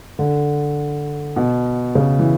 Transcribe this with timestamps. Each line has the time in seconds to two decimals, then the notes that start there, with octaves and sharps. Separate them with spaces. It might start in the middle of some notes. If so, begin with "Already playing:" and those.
0.19 D3
1.36 B2
1.95 C#3
2.19 E3